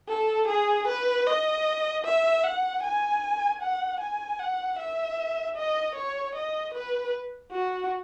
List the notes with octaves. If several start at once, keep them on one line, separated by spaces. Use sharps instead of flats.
A4
G#4
B4
D#5
E5
F#5
G#5
F#5
G#5
F#5
E5
D#5
C#5
D#5
B4
F#4